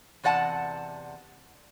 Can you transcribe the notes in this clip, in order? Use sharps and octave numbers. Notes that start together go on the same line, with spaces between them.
E2 C3 D5 F#5 A5